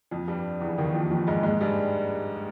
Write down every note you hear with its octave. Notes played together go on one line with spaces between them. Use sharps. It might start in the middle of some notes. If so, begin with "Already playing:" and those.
F2 F3
G2 G3
E2 E3
D#2 D#3
F2 F3
F2 F3
G#2 G#3
G#2 G#3
G2 G3